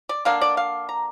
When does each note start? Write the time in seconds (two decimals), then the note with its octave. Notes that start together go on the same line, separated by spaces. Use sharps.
0.09 D5
0.25 D3 A#3 D4 F5
0.41 D5
0.57 F5
0.89 A#5